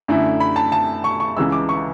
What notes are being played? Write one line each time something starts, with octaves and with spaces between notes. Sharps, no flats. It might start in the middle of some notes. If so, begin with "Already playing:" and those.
F#2 D3 A3 E4
B5
A5
A5
C#6
C#6
C#2 C#3 E3 G#3 E6
D6
C#6